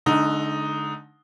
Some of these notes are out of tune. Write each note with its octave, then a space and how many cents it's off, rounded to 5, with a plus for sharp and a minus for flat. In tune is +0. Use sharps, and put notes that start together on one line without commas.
D3 +0 G#3 +45 D#4 +0